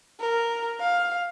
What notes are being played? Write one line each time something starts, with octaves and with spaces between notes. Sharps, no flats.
A#4
F5